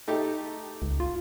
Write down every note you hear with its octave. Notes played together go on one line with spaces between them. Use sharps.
A3 D#4 G4
C#2
F4